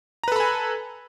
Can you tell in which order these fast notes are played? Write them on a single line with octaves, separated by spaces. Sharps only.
A#5 B4 A4 B5 G#5